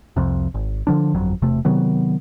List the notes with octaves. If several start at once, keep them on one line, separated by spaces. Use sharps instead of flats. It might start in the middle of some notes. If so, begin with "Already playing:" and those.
C2 F2 C3
G#1
D3 F3 D4
G1 F2 F#3
E1 C3 A3
C3 D#3 F#3 B3